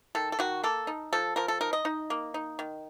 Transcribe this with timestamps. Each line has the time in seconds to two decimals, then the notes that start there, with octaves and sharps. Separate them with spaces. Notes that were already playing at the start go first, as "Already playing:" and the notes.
0.15 D#3 A4
0.32 A4
0.39 D#3 F#4
0.64 A#3 A4
0.87 D#4
1.13 F3 A4
1.36 F3 A#4
1.48 A4
1.61 D#4 A#4
1.73 D#5
1.85 D#4
2.10 A#3
2.34 D#4
2.59 D#3